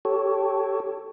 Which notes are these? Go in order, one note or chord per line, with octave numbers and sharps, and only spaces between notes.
G4 A4 C#5